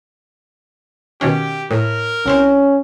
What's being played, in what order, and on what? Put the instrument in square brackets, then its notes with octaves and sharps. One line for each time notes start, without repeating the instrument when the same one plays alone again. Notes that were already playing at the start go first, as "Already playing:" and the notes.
[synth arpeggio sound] B2 D#3 C#4 [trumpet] G4
[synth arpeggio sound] A2 [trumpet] A#4
[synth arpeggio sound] C2 C4 C5 [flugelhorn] C#4